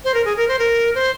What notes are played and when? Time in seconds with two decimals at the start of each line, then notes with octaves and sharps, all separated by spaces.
0.05 C5
0.14 A#4
0.25 G#4
0.37 A#4
0.48 C5
0.59 A#4
0.95 C5